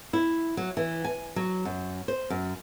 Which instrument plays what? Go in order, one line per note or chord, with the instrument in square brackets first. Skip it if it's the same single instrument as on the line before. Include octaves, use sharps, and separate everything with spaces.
[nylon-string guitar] E4
F#3
E3
G#5
F#3
F#2
C5
F#2